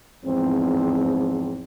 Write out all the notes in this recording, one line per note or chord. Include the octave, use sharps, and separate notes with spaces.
E2 G#2 F3 C4